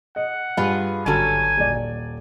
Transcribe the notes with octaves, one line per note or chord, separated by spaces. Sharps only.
D#5 F#5
G2 F4 G#4 B4
G#1 D3 F#3 C#4 F#4 A4 G#5
D#1 D5